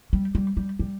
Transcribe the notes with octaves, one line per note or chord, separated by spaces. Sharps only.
G3
G3
G3
G3